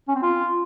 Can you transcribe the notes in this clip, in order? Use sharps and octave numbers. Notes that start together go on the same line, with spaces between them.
C#4
C4
F4